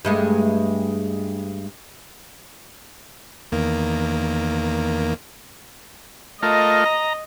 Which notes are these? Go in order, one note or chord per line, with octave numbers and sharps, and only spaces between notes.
G2 G#3 A3
E2 D#3 A#3
A3 F4 A#4 D#5
A#5